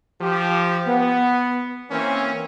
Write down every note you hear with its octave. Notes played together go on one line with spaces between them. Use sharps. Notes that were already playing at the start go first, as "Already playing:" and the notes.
F3 G4
B3
E3 A#3 C4 C#4